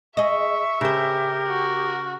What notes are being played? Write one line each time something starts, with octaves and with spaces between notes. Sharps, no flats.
G#4 D#5 E5 C#6
C#3 G4 A#4 C5
F#4